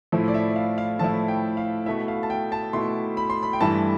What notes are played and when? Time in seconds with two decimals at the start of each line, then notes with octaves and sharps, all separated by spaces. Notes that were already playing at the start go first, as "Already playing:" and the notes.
0.12 A2 F3 A3 E4
0.28 D5
0.34 E5
0.56 F5
0.78 F5
0.99 A2 F3 A3 E4 A5
1.28 G5
1.57 F5
1.86 B2 A3 E4 E5
2.08 F5
2.23 A5
2.30 G5
2.52 A5
2.73 B2 A3 E4 C6
3.17 B5
3.30 C6
3.43 B5
3.53 G5
3.61 G2 E3 A3 E4 A5